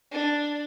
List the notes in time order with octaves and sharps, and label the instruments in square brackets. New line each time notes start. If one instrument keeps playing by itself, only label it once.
[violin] D4